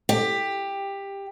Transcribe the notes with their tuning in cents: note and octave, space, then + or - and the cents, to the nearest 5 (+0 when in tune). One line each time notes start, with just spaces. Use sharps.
G4 +15